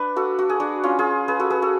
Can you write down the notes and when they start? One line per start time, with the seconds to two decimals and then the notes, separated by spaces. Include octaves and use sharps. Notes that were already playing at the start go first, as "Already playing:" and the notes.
Already playing: D4 B4
0.16 F#4 A4
0.39 F#4
0.49 G#4
0.60 D4 F#4
0.84 C#4 F4
0.99 F4 G#4
1.28 G#4 B4
1.39 F#4 A4
1.50 G#4 B4
1.62 F#4 A4